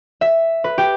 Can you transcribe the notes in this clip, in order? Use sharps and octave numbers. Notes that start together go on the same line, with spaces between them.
E5
B4
G4